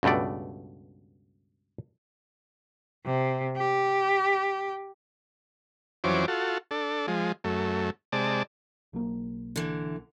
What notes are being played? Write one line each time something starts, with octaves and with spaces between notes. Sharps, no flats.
C#2 G2 B2 A3 D5
C3
G4
F2 E3 F#3 C#4 C5 D6
F4 F#4 A4
D4 A4
F3 G#3
F#2 A3
C3 G#3 D5 A5
B1 F#3 A#3
D3 E3